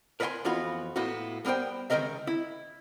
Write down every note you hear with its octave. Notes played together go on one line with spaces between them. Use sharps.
A#4 B4 D#5 F#5 G#5 C6
F2 E3 B3 F4 F#4 B5
A2 A#3 B3 E4 F#4
G3 B3 A#4 C5 G5
C#2 D#3 G3 A#4 D#5 E5
E4